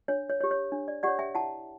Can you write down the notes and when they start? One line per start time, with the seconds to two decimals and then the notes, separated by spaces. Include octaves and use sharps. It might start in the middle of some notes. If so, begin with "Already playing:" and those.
0.08 D4 C#5
0.30 C#5
0.40 C#5
0.44 G4
0.51 C#5
0.72 D4
0.88 D5
1.03 G4 C#5 D5 F#5
1.19 E5 G5
1.35 E4 F#5 A5